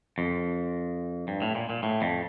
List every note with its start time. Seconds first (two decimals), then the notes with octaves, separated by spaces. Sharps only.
0.18 F2
1.28 G2
1.42 A2
1.55 A#2
1.70 A#2
1.83 A2
2.02 F2